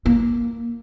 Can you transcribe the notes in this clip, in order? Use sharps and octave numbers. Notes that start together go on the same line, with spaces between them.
A#3